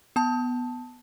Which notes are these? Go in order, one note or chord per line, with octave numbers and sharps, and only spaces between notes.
B3 A5